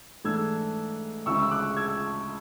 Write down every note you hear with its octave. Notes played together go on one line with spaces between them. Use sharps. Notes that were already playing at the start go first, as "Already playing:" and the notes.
G#2 E3 A3 D4 E6 G#6
D2 C#3 G#3 C#6 E6
E6
D6 F#6
E6 G#6